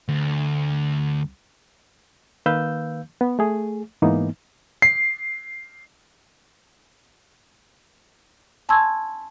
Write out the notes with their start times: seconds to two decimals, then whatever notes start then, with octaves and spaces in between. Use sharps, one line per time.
0.09 D2
2.46 D#3 A#3 B4 F5 E6 G6
3.21 B3
3.39 A3 G#4
4.02 G#2 E3 A#3 B3 D#4
4.82 C7
8.69 G#5 A5 C6 C#6 E6 G#6